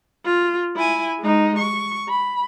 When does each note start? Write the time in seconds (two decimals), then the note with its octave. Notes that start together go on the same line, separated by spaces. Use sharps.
0.25 F4
0.76 E4 G#5
1.20 G#3 D#4
1.58 C#6
2.08 B5